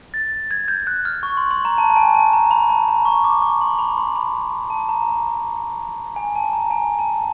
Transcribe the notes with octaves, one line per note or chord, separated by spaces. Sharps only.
A6
G#6
G6
F#6
F6
C#6
C6
C6
A#5
A5
A5
G#5
A5
A#5
B5
A5
A#5
C#6
D6
C#6
C6
B5
C6
B5
A5
A#5
G#5
A5
A#5
G#5
A5